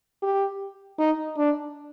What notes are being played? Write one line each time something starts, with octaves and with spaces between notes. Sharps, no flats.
G4
D#4
D4